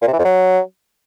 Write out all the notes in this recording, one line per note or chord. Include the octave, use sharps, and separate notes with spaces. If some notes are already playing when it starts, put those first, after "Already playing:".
A#2
C3
E3
F2
F#3